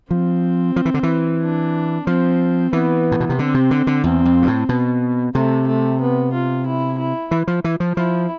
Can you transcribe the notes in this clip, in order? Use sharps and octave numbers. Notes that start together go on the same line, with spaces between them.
F3 C4
F3
E3
D3
E3
D4
F3 C4
E3 B3
A2
B2
C3
D3 C4
C3
D3
D3
E2 C4
F2
G2
A2
B2
C3 A3
A3
B3
F4
E4
E4
E3
F3
E3
F3
F3 E4